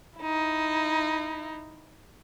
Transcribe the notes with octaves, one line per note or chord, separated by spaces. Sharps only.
D#4 E4